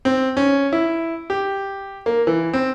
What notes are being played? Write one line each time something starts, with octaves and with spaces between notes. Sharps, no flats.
C4
C#4
E4
G4
A#3
E3
C4